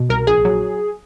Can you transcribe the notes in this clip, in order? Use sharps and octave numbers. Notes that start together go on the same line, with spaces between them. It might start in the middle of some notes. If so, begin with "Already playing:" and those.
Already playing: B2
C2 A#4
A#1 G#4
F#3